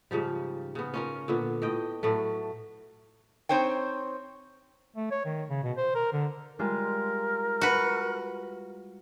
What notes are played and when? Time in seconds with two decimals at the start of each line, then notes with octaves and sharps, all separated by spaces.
0.11 G#2 C#3 F3 G3
0.75 C#3 B3
0.94 C#4 F4 A#4
1.28 A#2 D3 B3
1.62 A2 D#5 G5
2.03 A2 F#3 A3
3.49 C4 D#4 C5 C#5 G5
4.96 A3
5.11 C#5
5.25 D#3
5.50 C#3
5.64 B2
5.77 C5
5.95 A#4
6.13 D3
6.59 G3 G#3 F4 A#4
7.61 F#4 B4